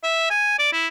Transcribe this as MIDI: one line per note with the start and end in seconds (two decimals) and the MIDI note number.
0.03 0.25 76
0.30 0.56 80
0.59 0.70 74
0.73 0.88 64